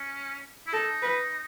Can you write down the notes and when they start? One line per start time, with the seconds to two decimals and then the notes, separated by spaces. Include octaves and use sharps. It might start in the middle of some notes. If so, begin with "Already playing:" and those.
Already playing: C#4
0.67 E4
0.73 D#4 A4
1.02 B4